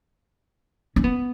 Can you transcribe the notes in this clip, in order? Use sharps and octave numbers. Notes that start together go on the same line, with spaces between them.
C#4
B3